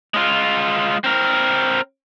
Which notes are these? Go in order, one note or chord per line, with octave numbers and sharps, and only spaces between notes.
G#3 F4
C4 A#4